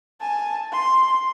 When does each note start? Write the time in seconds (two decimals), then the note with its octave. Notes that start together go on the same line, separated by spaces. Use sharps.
0.21 G#5 A5
0.72 C6